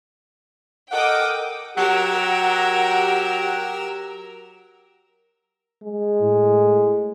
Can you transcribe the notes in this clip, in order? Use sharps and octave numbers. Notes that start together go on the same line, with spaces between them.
A4 A#4 D#5 F#5 G5 A#5 D6 D#6
F#3 G4 A#4 F#5 E6
G#3
A2